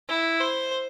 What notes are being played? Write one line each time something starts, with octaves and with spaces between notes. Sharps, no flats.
E4
C5